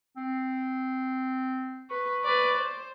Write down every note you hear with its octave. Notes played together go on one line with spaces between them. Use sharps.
C4
B4 C#6
B4 D5
C5